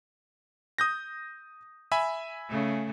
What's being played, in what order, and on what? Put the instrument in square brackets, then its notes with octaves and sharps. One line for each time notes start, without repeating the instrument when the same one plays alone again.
[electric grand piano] D#6 G6 A#6
E5 G#5 B5
[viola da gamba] C#3 A3